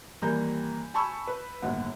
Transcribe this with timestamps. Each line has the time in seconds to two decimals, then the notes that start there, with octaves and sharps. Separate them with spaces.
0.22 D#2 E3 G3 A#3 A#5 G6
0.94 G#5 A5 B5 C#6 E6
1.27 B4
1.62 G1 D#2 A2 F#5